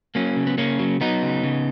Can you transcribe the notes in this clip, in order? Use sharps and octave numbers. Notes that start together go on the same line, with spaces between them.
F#3 A#3 C#4
C#3
B3
C#3 A#3 C#4
F#3
F#3 B3 D#4
C#3
C#3